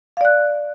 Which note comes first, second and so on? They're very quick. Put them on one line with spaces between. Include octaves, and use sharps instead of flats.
F5 D5 F#6